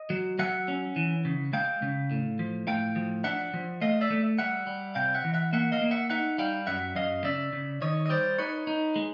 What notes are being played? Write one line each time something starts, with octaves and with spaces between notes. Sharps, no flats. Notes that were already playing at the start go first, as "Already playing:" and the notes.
Already playing: D#5
F#3
F#3 E5 F#5
C#4
E3
C#3
G#3 F5 G5
C#3
A2
F3
A2 F5 G5
F3
D4 E5 F#5
F3
A3 D#5 F5
D5 E5
A3
G3 E5 F#5
G3
C3 F5 G5
E5 F#5
E3
E5 F#5
A#3 E5 F#5
D#5 F5
A#3
E5 F#5
D#4 E5 F#5
G3 F5 G5
F#2 E5 F#5
F#2 D#5 F5
C#3 D5 E5
C#3
D#3 C#5 D#5
D#5
G3 C5 D5
D#4 B4 C#5
D#4
G#3